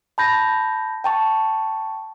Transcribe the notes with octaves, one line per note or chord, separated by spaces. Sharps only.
A5 B5 G6 A#6
G5 A5 C#6